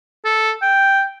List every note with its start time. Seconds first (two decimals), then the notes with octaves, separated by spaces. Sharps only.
0.25 A4
0.62 G5